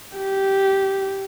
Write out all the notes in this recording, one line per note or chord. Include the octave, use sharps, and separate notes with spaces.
G4